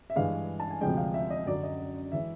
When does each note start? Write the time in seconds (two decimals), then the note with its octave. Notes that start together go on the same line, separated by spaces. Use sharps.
0.10 E5
0.16 G2 E3 G#3 F5
0.60 A5
0.70 G#5
0.81 D2 C3 F3 G#3 G5
0.97 F5
1.14 E5
1.30 D#5
1.46 F#2 D3 F#3 D5
1.63 D#5
2.12 E3 G#3 E5